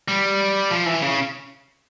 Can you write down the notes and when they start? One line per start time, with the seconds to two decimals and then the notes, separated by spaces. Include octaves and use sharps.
0.08 G3
0.71 F3
0.86 E3
1.02 C#3